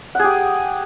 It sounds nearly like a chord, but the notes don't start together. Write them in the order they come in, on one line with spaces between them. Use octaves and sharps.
F#5 G#4 G4